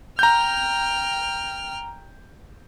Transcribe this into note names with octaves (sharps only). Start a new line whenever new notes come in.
G5 A#5 F6 G6